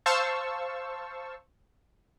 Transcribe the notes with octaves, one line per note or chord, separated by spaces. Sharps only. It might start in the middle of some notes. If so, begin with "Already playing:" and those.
C5 F5 A5 C#6 E6